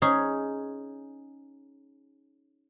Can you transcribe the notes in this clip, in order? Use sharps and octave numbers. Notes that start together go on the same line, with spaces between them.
C#4 D#4 G#4